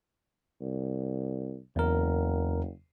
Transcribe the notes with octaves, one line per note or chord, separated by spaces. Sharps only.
C2
F#1 E2 A#4